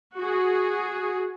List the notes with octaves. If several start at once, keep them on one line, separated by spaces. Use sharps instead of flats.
F#4 G#4